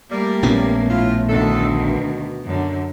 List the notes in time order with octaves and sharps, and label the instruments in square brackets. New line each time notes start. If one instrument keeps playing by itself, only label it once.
[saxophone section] G3 [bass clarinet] A3 [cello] A#3
[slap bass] A#1 B3 C#4
[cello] A2 [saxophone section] E4 F4
[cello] D2 D#3 [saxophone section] D4 E4 A4
[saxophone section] B2
[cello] F#2 D3